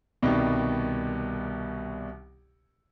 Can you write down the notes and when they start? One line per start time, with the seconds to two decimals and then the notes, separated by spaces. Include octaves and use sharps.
0.22 C2 B2 D#3 G3